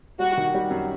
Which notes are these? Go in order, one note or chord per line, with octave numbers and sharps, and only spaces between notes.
G3 F#4
D#3
G3
F#2